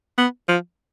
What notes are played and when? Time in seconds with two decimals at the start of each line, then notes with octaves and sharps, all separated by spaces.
0.18 B3
0.48 F3